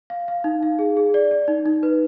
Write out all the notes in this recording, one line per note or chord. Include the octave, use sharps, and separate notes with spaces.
F5
F5
D#4
F5
G#4
G#4
D5
D5
D#4
D#4
B4